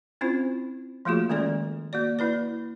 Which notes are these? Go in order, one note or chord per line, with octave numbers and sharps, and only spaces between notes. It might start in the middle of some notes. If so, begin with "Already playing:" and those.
C4 C#4 E4 F4 C5
F3 A3 A#3 F4 F#4 G#4
D#3 G#3 C#4 A4 D5
A#3 F#4 D5
A#3 E4 B4 D5